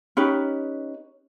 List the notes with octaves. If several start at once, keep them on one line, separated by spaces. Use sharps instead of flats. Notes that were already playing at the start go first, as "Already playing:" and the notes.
C#4 D#4 G4 B4